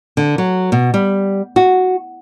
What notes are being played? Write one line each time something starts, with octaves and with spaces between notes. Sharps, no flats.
D3
F#3
B2
G3
F#4